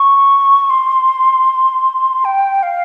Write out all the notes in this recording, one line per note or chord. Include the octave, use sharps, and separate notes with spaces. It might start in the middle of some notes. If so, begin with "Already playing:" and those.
Already playing: C#6
C6
G5
F5